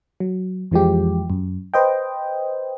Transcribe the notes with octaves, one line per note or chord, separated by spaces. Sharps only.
F#3
F2 E3 F3 G#3 G4
F#2
B4 C5 D#5 G5